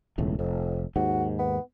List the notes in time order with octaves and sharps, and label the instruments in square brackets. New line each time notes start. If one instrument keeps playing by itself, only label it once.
[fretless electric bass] E1 C#2 A2
[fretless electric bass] F1 [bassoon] F2
[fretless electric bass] D#2 G#2 [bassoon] F#4
[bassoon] B3